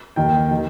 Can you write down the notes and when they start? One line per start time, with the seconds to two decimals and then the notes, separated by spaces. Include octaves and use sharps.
0.16 D#2 D#3 G5
0.51 D#3